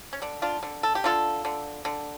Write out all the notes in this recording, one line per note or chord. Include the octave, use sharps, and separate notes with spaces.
C#4
D3 D4
D4 F4
D3
A4
G4
D3 F4 A4
D3
D3